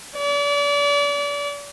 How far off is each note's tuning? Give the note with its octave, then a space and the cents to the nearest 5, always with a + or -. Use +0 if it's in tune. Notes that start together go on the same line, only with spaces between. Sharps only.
D5 -35